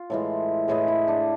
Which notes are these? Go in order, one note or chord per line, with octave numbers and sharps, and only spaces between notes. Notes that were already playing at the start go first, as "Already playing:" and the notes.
Already playing: F4
A2 E3 G#3
A2 E3 G#3 G#4
E4
D4